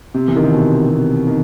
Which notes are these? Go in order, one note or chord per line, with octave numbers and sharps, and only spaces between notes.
C3
E3
D#3
C3
B2
C3
D#3